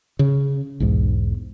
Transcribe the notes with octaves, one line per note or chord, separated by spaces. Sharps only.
C#3
B1 E2 G#2